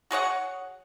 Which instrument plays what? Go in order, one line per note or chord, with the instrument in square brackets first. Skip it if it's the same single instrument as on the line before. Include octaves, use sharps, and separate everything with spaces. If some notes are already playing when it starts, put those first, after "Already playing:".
[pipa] F#4 G#4 C#5 F#5